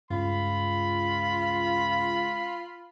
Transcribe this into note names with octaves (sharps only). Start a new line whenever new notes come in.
C#2 G2 F4 B5